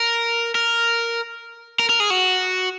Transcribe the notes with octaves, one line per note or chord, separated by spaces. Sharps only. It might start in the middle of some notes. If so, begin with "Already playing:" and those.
Already playing: A#4
A#4
A#4
A#4
G#4
F#4